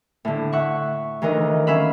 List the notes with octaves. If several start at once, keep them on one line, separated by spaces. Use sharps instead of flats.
A2 D3
E5 F#5 C#6
D2 D#3 E3 A#4 D#5
C#4 E5 F5 B5